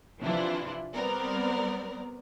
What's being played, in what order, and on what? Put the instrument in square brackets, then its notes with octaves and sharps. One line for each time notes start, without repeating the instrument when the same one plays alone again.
[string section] C3 E3 F3 D4 E4 F4
G3 B3 C4 A#4 D5